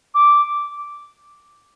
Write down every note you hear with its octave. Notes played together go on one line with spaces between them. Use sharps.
D6